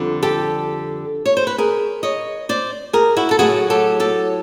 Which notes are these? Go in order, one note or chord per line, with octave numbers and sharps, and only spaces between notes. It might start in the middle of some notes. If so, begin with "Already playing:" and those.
Already playing: F2 D3 G3
G4 A4
C#5
C5
B4
G#4 A#4
C#5 D#5
C5 D5
G#4 A#4
E4 F#4
A4
A2 F#3 F#4 G#4
G4 A4
G4 A4